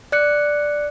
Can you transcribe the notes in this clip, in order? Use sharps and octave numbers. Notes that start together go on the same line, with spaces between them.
D5 F#6 C#7